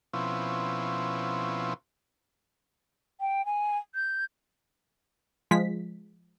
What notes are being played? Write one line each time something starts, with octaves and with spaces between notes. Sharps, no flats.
B2 F3 C4 C#4 E4
G5
G#5
G6
F3 G#3 B6